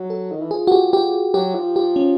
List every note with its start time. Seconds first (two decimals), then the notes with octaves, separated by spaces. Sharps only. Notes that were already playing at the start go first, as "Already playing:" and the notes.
Already playing: F#3
0.10 A4
0.32 D#3
0.42 E3
0.51 F3 G#4
0.67 F#4
0.72 G4
0.93 G4
1.34 F#3 G4
1.55 F3
1.76 G4
1.96 C#4